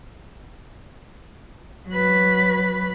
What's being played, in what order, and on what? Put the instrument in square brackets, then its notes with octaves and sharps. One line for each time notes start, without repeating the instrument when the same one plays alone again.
[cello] F#3 B4